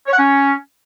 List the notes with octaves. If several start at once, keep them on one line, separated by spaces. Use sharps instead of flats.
C#5
F#5
C#4